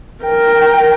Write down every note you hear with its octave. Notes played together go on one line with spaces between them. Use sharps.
A#4 G5